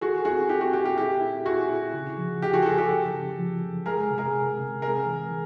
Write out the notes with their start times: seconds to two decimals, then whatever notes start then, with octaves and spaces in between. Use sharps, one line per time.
0.01 F#4 G#4 A4
0.25 C4 F#4 G#4
0.49 E4 G4
0.61 F#4
0.73 E4 G4
0.86 G4
0.97 E4 G4
1.21 E4
1.46 E4 F#4 G#4
1.69 E4
1.94 C#3
2.17 F3
2.42 C#3 G4
2.53 F#4 G#4
2.62 A4
2.66 F#2 F#4 G#4
2.78 G4 A4
2.89 F#2
3.14 C#3
3.38 F3
3.62 F#2
3.86 G#3 G#4 A#4
4.10 C3
4.18 G#4 A#4
4.34 C3
4.59 C3
4.82 C3 G#4 A#4
5.06 E3
5.30 E3